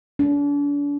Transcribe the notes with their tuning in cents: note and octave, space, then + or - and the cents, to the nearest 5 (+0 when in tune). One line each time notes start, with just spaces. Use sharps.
D4 -40